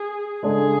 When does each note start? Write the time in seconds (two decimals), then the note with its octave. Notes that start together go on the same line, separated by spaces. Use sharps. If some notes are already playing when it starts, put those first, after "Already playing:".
Already playing: G#4
0.43 C#3 G#3 D4 G#4 A4